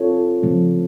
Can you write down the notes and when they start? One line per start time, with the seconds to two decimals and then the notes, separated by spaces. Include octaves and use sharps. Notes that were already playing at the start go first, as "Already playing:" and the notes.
Already playing: C4 F4 A4 C#5
0.43 C#3 F3 A3 C4